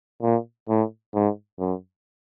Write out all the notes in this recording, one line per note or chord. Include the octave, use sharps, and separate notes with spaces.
A#2
A2
G#2
F#2